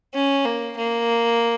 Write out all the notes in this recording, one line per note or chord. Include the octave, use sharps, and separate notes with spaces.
C#4
A#3
A#3